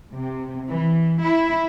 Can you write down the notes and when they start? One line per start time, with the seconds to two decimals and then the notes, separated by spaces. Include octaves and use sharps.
0.12 C3
0.69 E3
1.21 E4